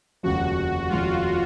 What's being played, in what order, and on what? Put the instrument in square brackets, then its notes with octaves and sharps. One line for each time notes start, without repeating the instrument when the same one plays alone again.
[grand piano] F1 D#2 C#3 F3 G#3 [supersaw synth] F#4
[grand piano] F1 D#2 C#3 F3 G#3 [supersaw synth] F4